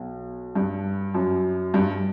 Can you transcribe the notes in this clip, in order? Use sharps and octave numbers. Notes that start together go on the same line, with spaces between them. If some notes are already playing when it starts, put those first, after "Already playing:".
Already playing: B1
G2
F#2
G2